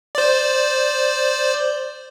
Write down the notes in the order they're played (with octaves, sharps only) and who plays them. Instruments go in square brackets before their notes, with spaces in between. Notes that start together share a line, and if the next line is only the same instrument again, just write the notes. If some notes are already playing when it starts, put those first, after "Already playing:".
[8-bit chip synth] C5 D5